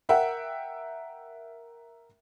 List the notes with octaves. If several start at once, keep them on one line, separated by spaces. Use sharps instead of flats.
A#4 E5 F#5 G5